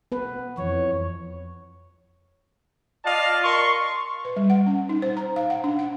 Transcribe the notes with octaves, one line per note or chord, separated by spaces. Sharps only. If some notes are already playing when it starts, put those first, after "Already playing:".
B3 B4
F2 E3 C#5
F4 D5 D#5 F5 A5
A#4 C6 C#6
B4
G3
F#5
C#4
D#4
C5
A#5
F5
F#5
D4
F#5